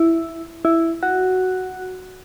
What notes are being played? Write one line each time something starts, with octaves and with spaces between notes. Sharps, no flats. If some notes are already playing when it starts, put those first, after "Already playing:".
Already playing: E4
E4
F#4